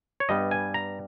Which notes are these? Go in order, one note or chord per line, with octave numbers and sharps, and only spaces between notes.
C#5
G2 G3 B3 D#5
G#5
A#5